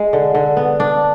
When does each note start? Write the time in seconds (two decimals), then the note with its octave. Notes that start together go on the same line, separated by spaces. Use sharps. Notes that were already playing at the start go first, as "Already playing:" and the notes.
Already playing: G#3
0.13 D3
0.35 D3
0.57 B3
0.80 D4